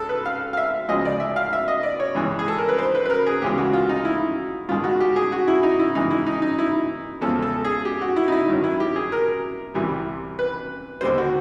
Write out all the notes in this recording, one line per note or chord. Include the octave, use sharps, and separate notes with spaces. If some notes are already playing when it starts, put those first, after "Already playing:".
Already playing: C#2 G#3 A4
B4
F5
F5
E5
D2 C#3 F3 G#3 D#5
D5
E5
F5
E5
D#5
D5
C#5
G2 E3 G#3
G#4
A4
A#4
B4
C5
B4
B4
A#4
G#4
D2 C#3 E3 G#3 G4
F#4
F4
D#4
E4
G2 D#3 G#3 F4
F#4
G4
G#4
F#4
E4
D#4
E4
G2 E3 G#3 D#4
E4
D#4
D#4
E4
E2 C#3 F3 G#3 A4
A4
G#4
G4
F#4
E4
D#4
E4
G2 D#3 F#3
E4
G4
G#4
A#4
C2 C3 E3 G3
B4
D#2 D3 G3 C5
F#4